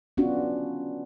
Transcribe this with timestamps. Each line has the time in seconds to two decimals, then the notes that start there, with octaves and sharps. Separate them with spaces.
0.17 B3 C#4 D4 F4 F#4